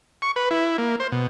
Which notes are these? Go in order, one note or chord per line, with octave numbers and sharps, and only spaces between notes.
C#6
B4
E4
A#3
C5
B2